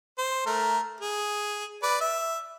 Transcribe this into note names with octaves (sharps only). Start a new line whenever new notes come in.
C5
A3 A#4
G#4
B4 D5
E5